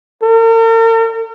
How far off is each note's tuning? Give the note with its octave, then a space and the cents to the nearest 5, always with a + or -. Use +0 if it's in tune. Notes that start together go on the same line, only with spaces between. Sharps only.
A#4 -45